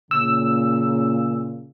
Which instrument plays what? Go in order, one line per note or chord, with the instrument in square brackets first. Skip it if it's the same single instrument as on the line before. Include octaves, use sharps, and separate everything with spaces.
[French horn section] A#2 C#3 [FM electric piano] E6